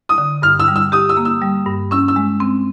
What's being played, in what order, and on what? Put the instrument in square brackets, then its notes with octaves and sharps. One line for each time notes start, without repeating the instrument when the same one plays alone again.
[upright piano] D#6
[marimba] D3
[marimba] G2 [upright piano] F6
[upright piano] E6
[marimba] G3
[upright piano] E6
[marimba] G4 [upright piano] D#6
[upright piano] E6
[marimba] A#3
[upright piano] E6
[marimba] G3
G2
[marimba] C#4 [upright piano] E6
[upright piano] E6
[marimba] G#3
C4